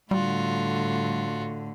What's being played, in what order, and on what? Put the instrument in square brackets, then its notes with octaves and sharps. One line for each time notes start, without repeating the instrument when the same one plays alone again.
[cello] A2 D3 [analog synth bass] G3 [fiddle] F4 F#4